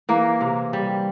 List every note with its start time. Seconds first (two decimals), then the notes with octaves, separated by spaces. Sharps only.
0.09 E3 A#3
0.41 C3
0.73 G3